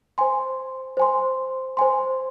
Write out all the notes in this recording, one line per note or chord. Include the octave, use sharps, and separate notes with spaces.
C5 G#5 C6
C5 G#5 C6
C5 G#5 C6